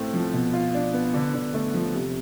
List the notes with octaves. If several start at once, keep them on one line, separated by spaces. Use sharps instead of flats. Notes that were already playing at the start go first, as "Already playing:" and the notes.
Already playing: A2 A3 C4
F3
B2
F4
D4
B3
D3
D3
A3
F3
C3